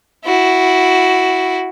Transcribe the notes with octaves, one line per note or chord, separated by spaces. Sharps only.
E4 F#4